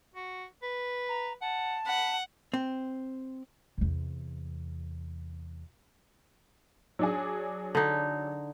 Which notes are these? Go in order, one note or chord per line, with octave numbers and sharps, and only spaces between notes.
F#4
B4
A#5
F#5 A5
F#5 B5
C4
E2 C3
F#3 D4 G#4
D3 D#4